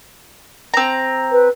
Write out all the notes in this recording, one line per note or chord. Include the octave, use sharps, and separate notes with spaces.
C4 A#5
B4